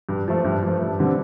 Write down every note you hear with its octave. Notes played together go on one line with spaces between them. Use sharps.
G2
F3 A3
G2
F3 A3
G2
D3 G3 C4 G4